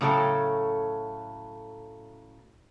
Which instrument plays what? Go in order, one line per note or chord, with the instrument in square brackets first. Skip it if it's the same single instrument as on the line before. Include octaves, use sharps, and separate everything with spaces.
[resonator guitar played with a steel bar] A2 C#3 F#3 A4 G5